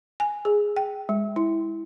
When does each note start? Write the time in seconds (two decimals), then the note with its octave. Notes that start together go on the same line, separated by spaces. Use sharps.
0.20 G#5
0.45 G#4
0.76 G5
1.09 G#3
1.36 E4